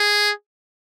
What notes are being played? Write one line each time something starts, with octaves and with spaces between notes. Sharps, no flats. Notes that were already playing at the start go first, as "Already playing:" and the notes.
Already playing: G#4